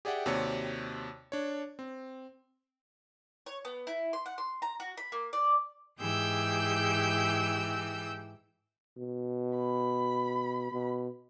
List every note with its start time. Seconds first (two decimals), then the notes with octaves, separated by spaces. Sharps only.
0.05 G4 G#4 D5 E5 F#5 G5
0.26 D#2 C3 F#4 C#5 D5 C#7
1.32 D4 C#5
1.79 C4
3.46 C#5
3.65 B3
3.87 E4
4.13 C6
4.26 F#5
4.38 C6
4.62 A#5
4.80 F#4
4.97 B5
5.12 A#3
5.33 D5
6.00 G#2 E3 G4 G#4 E6 G6
8.97 B2
9.58 B5
10.72 B2